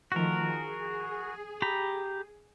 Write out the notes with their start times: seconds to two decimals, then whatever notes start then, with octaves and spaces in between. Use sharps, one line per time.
0.12 D#3 F3 A3 F#4 A#4
0.48 G#4
1.62 G4 A#5 B5